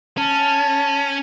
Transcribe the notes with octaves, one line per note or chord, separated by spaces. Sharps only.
C#4 A5